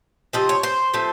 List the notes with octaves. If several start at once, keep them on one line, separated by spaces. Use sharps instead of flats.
C3 F3 C4 D#5
C#5
C5
F3 A3 C4